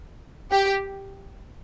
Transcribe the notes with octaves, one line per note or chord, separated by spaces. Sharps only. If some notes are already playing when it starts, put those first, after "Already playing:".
G4